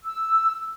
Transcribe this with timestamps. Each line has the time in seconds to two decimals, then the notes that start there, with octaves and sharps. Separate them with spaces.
0.03 E6